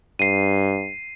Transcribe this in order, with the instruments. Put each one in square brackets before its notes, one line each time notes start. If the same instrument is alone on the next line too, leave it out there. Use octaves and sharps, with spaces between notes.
[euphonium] G2 [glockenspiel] C7 D#7